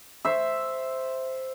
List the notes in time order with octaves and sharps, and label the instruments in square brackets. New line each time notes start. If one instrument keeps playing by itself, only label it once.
[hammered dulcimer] C5 E5